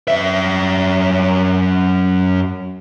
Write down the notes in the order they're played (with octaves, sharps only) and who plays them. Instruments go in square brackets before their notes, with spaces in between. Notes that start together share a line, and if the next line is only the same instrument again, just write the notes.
[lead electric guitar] F#2 E5